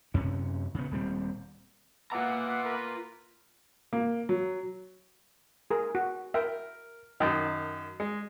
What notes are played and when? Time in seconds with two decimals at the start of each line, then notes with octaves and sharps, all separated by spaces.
0.14 F#2 C3 C#4
0.74 C#3 B3
0.91 D#1 G3 C4
2.12 B3 F4 E5 F#5 A#5 D6
2.63 A#4 B4
3.93 A#3
4.29 F#3
5.71 G#4 A#4
5.95 F#4
6.34 A#4 E5 G5
7.20 F#2 D#3 D#5 G5
8.00 G#3